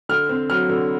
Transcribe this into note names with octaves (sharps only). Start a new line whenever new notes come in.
D3 F6
C4
F#3 F6
D3